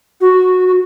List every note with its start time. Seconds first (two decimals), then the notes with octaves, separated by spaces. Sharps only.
0.21 F#4
0.66 F#4